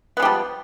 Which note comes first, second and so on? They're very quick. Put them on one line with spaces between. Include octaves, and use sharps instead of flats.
B3 G#3 G3 F3